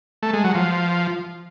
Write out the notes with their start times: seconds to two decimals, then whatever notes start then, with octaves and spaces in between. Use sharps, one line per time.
0.23 A3
0.33 G#3
0.44 F#3
0.55 F3